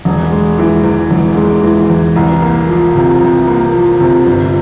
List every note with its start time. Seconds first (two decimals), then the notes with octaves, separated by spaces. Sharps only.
0.05 E1
0.32 G#3
0.58 E3
0.84 E2
1.11 E1
1.37 G#3
1.63 E3
1.89 E2
2.16 C2
2.42 A#3
2.68 F3
2.95 C3
3.21 C2
3.47 A#3
3.73 F3
4.00 C3
4.26 G1